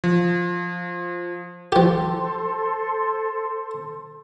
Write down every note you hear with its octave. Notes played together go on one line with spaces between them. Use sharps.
F3
F3 G4 A4 C5 C6